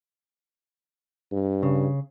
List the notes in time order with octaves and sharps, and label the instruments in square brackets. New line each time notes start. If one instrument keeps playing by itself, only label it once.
[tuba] G2
[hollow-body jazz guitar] C#3